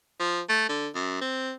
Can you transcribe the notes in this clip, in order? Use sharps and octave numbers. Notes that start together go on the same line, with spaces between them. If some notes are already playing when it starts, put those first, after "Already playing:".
F3
A3
D3
F#2
C4